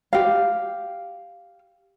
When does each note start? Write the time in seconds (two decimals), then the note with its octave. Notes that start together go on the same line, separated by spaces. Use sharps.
0.13 G4 F5